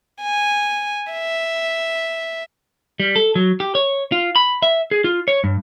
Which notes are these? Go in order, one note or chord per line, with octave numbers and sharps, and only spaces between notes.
G#5
E5
G3
A4
F#3
G4
C#5
F4
B5
E5
G#4
F4
C#5
G2